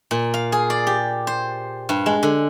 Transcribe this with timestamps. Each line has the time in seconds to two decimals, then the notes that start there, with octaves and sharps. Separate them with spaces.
0.11 A#2
0.34 F5
0.52 G#4
0.70 D5
0.87 G4
1.27 C5
1.89 G2
2.06 G#3
2.23 D3